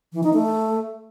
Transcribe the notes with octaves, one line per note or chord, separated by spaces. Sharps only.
E3
D#4
A3